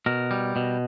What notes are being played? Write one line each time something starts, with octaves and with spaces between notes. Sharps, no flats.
B2 A#4
G3
B2